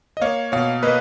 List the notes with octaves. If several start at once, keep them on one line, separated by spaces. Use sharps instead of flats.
D#5
A#3 C#5 F5
B2 C#5 F5
A#3 B4 D#5